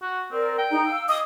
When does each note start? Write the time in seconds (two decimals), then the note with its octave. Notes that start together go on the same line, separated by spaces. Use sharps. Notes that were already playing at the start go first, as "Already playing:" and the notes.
0.02 F#4
0.32 C4 A#4 D5
0.58 G5
0.72 D#4 G#4 A#5
0.85 F5 E6
1.09 D#5 D6 D#6